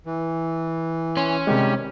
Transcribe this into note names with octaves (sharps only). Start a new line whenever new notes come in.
E3
C#4 C6
C3 D#3 G3 G#3 G4